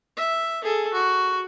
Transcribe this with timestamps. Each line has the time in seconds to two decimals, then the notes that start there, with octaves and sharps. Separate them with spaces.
0.16 E5
0.64 G#4 A4
0.93 F#4